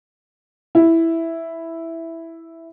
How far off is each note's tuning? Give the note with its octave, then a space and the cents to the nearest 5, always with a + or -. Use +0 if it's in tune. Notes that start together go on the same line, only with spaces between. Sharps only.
E4 +0